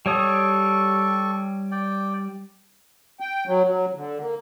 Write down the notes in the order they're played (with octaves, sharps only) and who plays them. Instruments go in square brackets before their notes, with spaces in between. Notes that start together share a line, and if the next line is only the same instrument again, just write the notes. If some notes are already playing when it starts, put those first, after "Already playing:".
[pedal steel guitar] G3 C#5 D#6 [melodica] A4 C#6
[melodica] D5 G5
[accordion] G5
F#3
F#3
D3
A#3